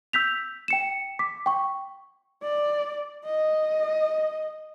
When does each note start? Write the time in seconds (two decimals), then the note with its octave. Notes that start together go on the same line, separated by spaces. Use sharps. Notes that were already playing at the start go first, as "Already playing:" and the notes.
0.13 E6 G6 B6 F7
0.68 G5 C#7 E7
1.19 D6 B6
1.46 G5 C#6
2.43 D5
3.25 D#5